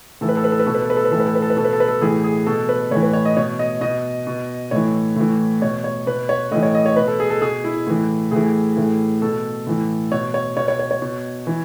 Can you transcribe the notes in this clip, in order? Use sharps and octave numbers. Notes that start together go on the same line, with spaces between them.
A2 E3 A4
B4
A4
B4
A4
B4
B2 A4
B4
A4
B4
A4
B4
A2 E3 A4
B4
A4
B4
A4
B4
B2 A4
B4
A4
B4
A4
A2 E3 G#4
G#4
B2 A4
B4
A2 E3 C#5
B4
C#5
D#5
B2 C#5
D#5
B2 D#5
B2
A2 E3 C#5
A2 E3
B2 C#5
C#5
B2 B4
C#5
A2 E3 D#5
C#5
D#5
C#5
B2 B4
A4
G#4
A4
B2 G#4
E4
A2 E3
A2 E3 G#4
A2 E3
B2 A4
A2 E3
B2 C#5
C#5
B2 C#5
C#5
C#5
C#5
B2
E3